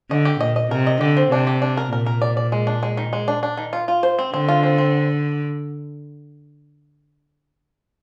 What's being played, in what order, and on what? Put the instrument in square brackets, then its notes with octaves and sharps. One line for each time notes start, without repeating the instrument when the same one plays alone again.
[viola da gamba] D3 [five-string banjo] D#5
[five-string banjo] G4
[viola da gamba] A#2 [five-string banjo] D#5
[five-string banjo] D#5
[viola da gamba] C3 [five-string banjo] A#4
[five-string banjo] D#5
[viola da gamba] D3 [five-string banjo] G4
[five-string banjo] C4
[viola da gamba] C3 [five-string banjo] D4
[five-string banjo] G4
D4
A#4
[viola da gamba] A#2 [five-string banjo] A#4
[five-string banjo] A#4
D5
D5
G#3
D4
G#3
D#3
G#3
D4
D4
D#3
F4
F4
C5
C4
[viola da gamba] D3 [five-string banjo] C4
[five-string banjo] F4
C4
C4